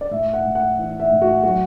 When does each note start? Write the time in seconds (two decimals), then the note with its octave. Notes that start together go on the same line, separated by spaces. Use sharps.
0.01 D5
0.11 A2 E5
0.33 F#5
0.44 A2
0.55 F#5
0.78 E3
1.00 E5
1.10 A2
1.21 F#4
1.43 F#3 F#4